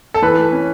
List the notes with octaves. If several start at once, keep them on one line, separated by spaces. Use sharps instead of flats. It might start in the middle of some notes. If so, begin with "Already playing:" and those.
A4
E3 B4
A3
C#4